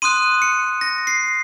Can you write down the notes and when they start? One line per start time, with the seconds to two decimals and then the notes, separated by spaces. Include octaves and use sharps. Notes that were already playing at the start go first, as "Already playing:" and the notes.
0.02 C6 D#6 F#6 D#7
0.42 C#7
0.81 A#6
1.07 C7